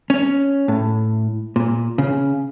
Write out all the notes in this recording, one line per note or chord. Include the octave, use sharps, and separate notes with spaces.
C#4
A2
A#2
C#3